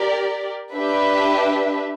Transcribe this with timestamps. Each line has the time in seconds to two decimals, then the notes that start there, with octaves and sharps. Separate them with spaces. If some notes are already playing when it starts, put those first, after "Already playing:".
Already playing: G4 A#4 D5
0.74 D4 G4 B4 E5